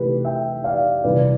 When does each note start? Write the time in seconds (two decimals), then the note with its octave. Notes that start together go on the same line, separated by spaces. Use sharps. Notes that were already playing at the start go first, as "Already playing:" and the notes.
Already playing: C3 E3 A3 G4 B4
0.25 E5 G5
0.64 D5 F5
1.04 C3 E3 G3 C4 B4 D5